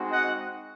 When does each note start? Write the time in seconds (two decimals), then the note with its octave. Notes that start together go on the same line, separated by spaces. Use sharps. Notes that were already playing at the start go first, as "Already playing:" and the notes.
Already playing: G#3 C4 D#4 F#4
0.10 D#5 F#5